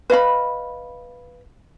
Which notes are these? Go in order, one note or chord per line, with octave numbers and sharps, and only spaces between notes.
B4 D#5 F5 B5